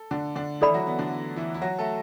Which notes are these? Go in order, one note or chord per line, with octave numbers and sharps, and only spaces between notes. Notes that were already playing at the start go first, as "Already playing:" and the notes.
Already playing: A4
D3 D4
D3 D4
E3 E4 A4 D5 B5
F#3 F#4
B3
D3 D4
E3 E4
E4
F#3 F#4
A3 A4